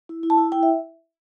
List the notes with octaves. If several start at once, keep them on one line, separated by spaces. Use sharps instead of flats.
E4
E4
A5
E4
E4 G5
E5